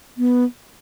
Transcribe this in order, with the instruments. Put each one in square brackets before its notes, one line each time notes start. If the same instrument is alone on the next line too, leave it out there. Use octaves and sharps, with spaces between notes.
[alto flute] B3